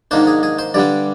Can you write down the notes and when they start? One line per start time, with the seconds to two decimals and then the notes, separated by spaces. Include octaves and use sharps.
0.11 G#2 D#3 A#3 D4 C5
0.27 G#4
0.43 G#4
0.59 C5
0.74 G2 D3 G3 D4 D5